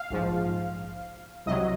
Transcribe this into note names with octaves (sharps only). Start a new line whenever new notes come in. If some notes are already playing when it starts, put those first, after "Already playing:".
Already playing: F5
A#1 G#2 F3
C2 C3 F#3 D#5